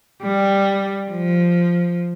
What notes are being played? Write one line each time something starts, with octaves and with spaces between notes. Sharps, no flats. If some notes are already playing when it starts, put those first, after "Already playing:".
G3
F3